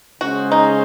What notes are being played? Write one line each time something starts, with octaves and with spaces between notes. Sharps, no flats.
C#3 G#3 C#4 F#4 G#4 C5
D#4